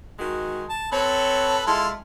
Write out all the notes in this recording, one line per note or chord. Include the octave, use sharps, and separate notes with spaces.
D#3 G#3 F#4
A5
C4 A4 B4 C#5
G#3 E4 F4 A4